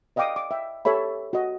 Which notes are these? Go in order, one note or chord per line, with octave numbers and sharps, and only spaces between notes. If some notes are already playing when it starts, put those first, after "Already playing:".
D5 D#5 F5 G5 D6 D#6
D6
E5 G5
G4 A4 C#5 E5 B5
F#4 D#5